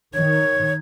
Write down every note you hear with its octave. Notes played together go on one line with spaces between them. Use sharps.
D#3 C#5 G#6